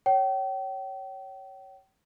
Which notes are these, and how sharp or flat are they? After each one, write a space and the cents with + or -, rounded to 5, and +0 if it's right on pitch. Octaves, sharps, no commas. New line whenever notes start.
C#5 +0 G5 -35